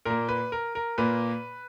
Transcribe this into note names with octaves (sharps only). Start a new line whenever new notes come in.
A#2 A#3 A#4
B4
A#4
A#4
A#2 A#3 B4